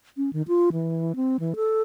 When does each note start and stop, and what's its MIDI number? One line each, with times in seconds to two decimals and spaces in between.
0.17 0.30 61
0.33 0.42 51
0.48 0.69 65
0.72 1.16 52
1.16 1.37 60
1.40 1.54 52
1.56 1.82 69